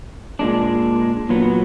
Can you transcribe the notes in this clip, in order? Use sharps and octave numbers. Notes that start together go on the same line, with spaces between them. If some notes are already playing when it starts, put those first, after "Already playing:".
A#2 G#3 D4
A#2 F#3 B3